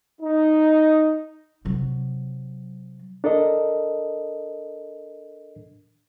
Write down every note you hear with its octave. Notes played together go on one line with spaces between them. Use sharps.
D#4
C3 F#3
D4 A4 A#4 D#5